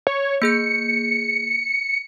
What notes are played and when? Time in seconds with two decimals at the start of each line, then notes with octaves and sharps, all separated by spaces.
0.07 C#5
0.42 A#3 G#4 G6 C#7